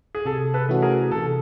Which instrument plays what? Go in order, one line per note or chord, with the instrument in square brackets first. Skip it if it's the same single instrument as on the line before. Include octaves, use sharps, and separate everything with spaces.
[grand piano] G#4
[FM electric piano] C3 [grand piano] A4
[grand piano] A4 B4
[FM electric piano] E3 A3 C#4 F#4
[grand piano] G#4 A#4
[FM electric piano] C3 [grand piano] A4